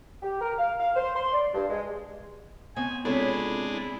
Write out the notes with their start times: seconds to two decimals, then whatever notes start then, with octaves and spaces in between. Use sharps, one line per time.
0.22 G4
0.41 A#4
0.58 F5
0.78 F5
0.96 C5
1.16 C6
1.32 D5
1.54 G2
1.70 G#3
2.76 B2 C4 G#5
3.05 C3 G#3 D4 E4 F4 A4 C#5 B5
3.72 E4